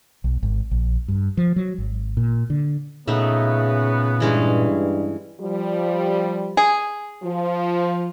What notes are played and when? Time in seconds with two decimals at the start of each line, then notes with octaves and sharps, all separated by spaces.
0.24 B1
0.43 G#1
0.71 A#1
1.08 G2
1.37 F3
1.56 F#3
1.78 G#1
2.17 A#2
2.50 D3
3.08 A#2 C#3 A3 B3 D#4
4.20 G2 E3 G#3 C#4
5.40 F3 G3
6.57 G#4
7.24 F3